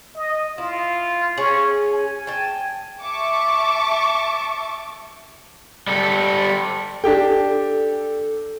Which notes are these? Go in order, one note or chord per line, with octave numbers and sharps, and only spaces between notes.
D#5
E4 F4
C#4 G#4 C#5
G#5
G5 A5
E5 A5 C#6 D6
G3 A4
D4 G4 A4 G5